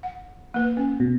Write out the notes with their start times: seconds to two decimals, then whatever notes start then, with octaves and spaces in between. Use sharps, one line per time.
0.03 F#5
0.54 A#3 B4
0.77 C#4
1.00 B2